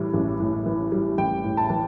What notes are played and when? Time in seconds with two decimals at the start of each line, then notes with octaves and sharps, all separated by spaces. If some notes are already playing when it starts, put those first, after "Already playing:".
Already playing: A2 E3 G3
0.14 A1
0.40 A2
0.66 E3
0.92 G3
1.18 A1 G5
1.44 A2
1.57 A5
1.70 E3